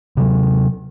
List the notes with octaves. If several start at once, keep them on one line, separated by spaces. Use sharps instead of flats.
C3 F#3